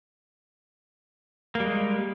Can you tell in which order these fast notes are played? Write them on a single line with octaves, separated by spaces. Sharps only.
A#3 G3 G#3